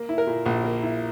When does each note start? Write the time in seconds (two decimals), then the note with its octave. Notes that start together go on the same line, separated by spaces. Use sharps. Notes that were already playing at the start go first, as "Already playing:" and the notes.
Already playing: A#3
0.09 E4
0.18 A#4
0.27 A#2
0.46 A#1
0.64 A#3
0.83 E4